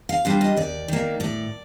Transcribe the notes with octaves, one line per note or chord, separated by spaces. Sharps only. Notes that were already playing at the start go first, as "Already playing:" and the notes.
F5
G3 D4 F4 F5
D#5
D#2 D5
D#3 A#3
A2 D5